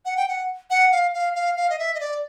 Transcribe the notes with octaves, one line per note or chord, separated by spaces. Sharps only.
F#5
G5
F#5
F#5
F5
F5
F5
F5
D#5
E5
D#5
D5